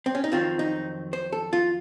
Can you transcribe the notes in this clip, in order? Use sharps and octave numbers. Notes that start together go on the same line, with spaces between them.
C4
C#4
D#4
F2 D#3 F#3 C4 F4
D#4
C5
A4
F4